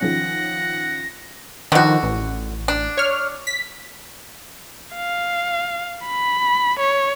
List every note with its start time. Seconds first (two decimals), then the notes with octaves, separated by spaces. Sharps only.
0.01 D#3 F3 C#4 F#5 A#6
1.72 D3 D#3 F3 F#4
2.03 A1
2.68 D4
2.97 C#5 F6
3.47 B6
4.95 F5
6.06 B5
6.79 C#5